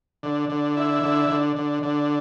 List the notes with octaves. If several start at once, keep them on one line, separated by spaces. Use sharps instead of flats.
D3
D3
E4
D3
D3
D3
D3